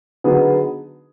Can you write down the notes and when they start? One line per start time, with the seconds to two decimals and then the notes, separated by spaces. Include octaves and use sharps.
0.24 D3 F#3 B3 D#4 G#4